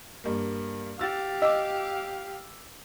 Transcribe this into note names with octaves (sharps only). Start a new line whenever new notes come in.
G2 A#3
G4 F5 E6 A6
D#5 D6 E6